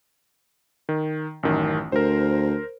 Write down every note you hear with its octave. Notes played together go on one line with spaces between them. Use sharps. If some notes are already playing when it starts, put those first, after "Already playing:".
D#3
A1 F#2 D#3
D2 A#4 C5